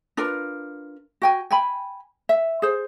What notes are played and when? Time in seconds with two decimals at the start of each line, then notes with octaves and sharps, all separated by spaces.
0.17 D4 F4 A#4 B4
1.22 F#4 G5 G#5
1.51 G5 G#5 B5
2.29 E5
2.62 G#4 C5